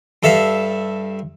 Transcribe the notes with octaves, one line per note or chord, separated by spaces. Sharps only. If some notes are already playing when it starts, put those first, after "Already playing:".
G2 A4 E5 F5